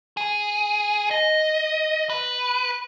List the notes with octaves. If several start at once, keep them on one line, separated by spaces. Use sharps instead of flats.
G#4
D#5
B4